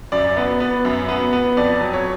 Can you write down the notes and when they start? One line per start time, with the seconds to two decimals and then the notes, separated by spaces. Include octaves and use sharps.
0.12 F#2 D5
0.37 B3
0.60 B3
0.85 F#2
1.08 B3
1.33 B3
1.57 F2 D5
1.81 F#3
1.93 C#5